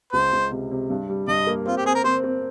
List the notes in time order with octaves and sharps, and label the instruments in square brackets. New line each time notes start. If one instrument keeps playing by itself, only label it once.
[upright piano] C#2 [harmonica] C5
[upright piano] C#2
C3
C3
G2
G3
[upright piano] G2 [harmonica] D#5
[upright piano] A#3
[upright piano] C4 [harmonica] F4
[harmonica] G4
[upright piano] C4 [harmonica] G#4
[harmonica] A#4
[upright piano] C4 [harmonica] C5
[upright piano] C4